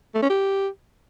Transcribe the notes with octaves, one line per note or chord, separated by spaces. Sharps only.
A3
C#4
G4